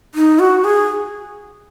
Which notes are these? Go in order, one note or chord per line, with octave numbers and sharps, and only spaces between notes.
D#4
F#4
G#4